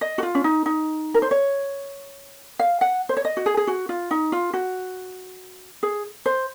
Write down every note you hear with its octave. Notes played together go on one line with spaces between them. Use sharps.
D#5
F#4
F4
C#4
D#4
D#4
A#4
C5
C#5
F5
F#5
C5
C#5
D#5
F#4
G#4
G#4
F#4
F4
D#4
F4
F#4
G#4
C5